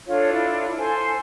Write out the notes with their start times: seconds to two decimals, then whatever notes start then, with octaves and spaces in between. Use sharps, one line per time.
0.07 D4 F4 A4 C#5
0.33 E4
0.78 A4 C5 G#5